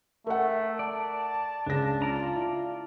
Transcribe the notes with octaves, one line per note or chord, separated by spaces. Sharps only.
A3 A#4 F#5
D5 A5
C#2 C#3 D4 A#6
F4 D5 A#5
E4